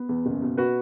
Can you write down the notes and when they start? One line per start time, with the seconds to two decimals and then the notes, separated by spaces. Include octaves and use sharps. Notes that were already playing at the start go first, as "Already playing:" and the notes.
Already playing: B3
0.09 E2
0.26 F#1
0.42 B2
0.57 F#4 B4